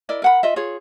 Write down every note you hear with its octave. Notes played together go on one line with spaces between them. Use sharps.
E4 A#4 D5 D#5
A#4 F#5 B5
F4 D#5 E5
F4 G#4 C#5